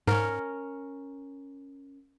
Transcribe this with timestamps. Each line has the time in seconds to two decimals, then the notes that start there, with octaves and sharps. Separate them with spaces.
0.07 G#2 C#4 A#4